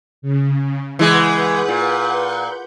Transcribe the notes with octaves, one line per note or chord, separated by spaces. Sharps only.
C#3
E3 G#3 B4 F#5 G6
A#2